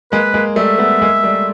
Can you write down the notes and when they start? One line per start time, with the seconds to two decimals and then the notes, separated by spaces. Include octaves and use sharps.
0.12 G#3 A#3 B4
0.34 G#3 A#3
0.56 G3 A3 E5
0.79 A3 B3
1.02 G#3 A#3
1.24 G3 A3